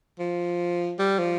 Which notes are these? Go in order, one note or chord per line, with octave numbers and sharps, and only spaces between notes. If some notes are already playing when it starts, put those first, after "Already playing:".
F3
G3
F3